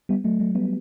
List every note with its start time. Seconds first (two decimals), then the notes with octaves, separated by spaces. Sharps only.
0.09 G3 B3
0.24 F#3 A3
0.40 F#3 A3
0.51 A3
0.55 G3 B3